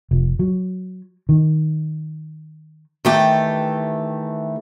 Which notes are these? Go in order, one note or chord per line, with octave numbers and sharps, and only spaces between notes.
F1
F#3
D#3
D#3 E3 A3 G4 G5